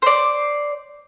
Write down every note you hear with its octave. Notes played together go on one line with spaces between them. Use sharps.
C5 D5